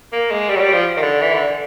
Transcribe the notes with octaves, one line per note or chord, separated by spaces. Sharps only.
A#3
G#3
G3
F#3
G3
F3
D#3
D3
E3
D3